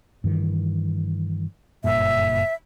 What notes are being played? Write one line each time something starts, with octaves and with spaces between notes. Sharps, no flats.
G2 D#3 E3
F#1 G2 A#2 E5